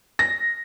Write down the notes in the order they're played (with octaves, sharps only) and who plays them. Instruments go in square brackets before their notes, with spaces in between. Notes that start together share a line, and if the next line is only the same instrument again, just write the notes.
[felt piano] A#6